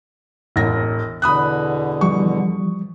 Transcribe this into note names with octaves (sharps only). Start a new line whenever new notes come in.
E1 A1 A#6
E2 B2 D3 B5 D#6 F#6
E3 F3 G3 C#6